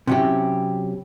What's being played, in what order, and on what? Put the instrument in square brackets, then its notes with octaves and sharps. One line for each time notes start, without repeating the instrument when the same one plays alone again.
[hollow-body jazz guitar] C3 F#3 C#4 E4 G4